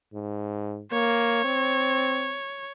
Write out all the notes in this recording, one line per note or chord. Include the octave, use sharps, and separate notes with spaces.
G#2
A#3 C#5
C4